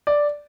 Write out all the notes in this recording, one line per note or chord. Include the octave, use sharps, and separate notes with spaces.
D5